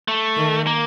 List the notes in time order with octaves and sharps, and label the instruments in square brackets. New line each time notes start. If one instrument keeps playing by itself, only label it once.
[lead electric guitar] A3
[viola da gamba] D#3
[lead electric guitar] A#3